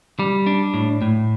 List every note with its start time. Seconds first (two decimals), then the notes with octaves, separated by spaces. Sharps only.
0.19 G3
0.47 D4
0.74 A2
1.02 A2